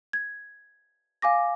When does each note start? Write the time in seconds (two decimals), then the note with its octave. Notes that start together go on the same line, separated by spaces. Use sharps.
0.13 G#6
1.22 F5 G#5 D6 A#6